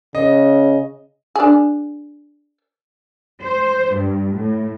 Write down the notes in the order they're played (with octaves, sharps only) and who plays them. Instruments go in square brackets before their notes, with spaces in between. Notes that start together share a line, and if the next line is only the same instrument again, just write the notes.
[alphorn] C#3 [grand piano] D#5
[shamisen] D4 G#4
[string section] C5
G2
A2